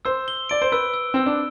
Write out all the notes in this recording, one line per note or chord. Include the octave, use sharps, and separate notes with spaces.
C5 E6
G7
D5 D7
C5
B4 E6
E6
C4 E6
D4